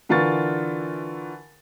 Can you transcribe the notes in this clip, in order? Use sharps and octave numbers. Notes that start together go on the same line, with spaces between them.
D3 E3 F4 A#4 C#6 A6